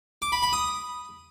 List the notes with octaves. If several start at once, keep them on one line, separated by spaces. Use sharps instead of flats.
D6
B5
B5
D#6